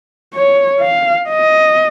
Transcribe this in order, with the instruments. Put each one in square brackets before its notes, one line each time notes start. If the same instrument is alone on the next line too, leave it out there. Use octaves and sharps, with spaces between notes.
[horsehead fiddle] C#5
F5
D#5